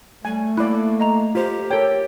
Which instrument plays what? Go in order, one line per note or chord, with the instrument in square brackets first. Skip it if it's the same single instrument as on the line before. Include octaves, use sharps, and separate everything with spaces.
[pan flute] G3 [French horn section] A3 [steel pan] G#5
[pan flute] A#3 [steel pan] E4 D5 [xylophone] B5 F#6
[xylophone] D#5 A#5 F7
[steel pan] F4 C5 [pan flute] G4
[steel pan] A4 G5 [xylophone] A#4 C#5 G#6